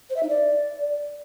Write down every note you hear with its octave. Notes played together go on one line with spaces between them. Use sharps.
C5
E5
D#4
D5